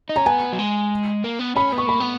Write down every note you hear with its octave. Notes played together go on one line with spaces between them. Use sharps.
D#4
C#4 A#5
B3 G#5
F#3
G#3
A#3
B3
C#4 B5
B3
C#6
A#3 B5
B3